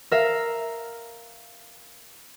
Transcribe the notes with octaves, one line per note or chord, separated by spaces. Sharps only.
A#4 E5 F5